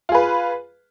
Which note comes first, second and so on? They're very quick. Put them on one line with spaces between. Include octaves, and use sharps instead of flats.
F4 G#4 B4